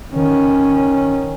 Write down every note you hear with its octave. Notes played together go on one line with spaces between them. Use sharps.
D#3 C#4